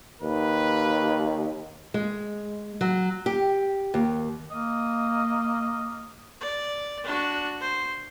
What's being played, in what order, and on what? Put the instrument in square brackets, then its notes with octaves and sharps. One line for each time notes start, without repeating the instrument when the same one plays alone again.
[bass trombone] D#2 [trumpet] B4
[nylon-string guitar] G#3
F#3
G4
D#2
[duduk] A#3 [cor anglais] D#5
[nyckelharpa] D5
D4 F#4
C5